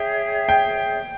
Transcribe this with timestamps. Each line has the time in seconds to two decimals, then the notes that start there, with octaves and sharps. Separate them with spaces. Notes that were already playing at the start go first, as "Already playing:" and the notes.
Already playing: G#4 C#5 E5 G5
0.49 G5